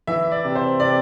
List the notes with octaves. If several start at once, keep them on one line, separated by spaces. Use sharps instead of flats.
E3 E5
D5
C3
C5
C3 D5